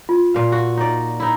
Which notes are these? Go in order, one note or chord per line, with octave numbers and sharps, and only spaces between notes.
F4
A#2 F5
F#4
D#4 D5
D#4 E4